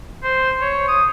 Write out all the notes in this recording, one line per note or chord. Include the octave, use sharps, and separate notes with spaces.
C5
C#5
D#6